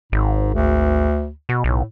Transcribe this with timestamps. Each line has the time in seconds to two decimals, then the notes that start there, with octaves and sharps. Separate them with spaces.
0.12 G#1 G#2
0.54 D2
1.49 B2
1.64 B1 A2